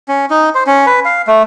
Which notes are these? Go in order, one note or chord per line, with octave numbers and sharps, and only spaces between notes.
C#4
D#4
C5
C#4
B4
F5
A3